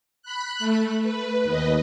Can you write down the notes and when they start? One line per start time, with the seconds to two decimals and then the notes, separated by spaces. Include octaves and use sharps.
0.22 B5 F#6
0.59 A3
1.03 B4
1.44 D#2 B4 D#5